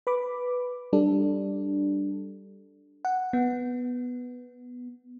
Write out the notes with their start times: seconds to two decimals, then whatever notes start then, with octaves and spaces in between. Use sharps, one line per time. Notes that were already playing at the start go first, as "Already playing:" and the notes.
0.07 B4 B5 D6
0.93 G3 D4 A4
3.05 F#5
3.33 B3